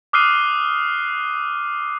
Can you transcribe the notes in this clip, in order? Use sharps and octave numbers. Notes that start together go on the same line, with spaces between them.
D6 D#6 F6 F#6 C7 D#7